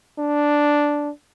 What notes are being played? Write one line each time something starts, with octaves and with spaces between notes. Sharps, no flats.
D4